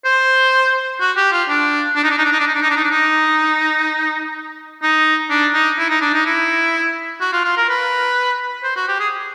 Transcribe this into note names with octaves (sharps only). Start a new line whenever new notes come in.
C5
F#4
G4
F4
D4
D4
D#4
D4
D#4
D4
D#4
D4
D#4
D4
D#4
D4
D#4
D4
D#4
D#4
D4
D#4
E4
D#4
D4
D#4
E4
F#4
F4
F4
A#4
B4
C5
F#4
G4
G#4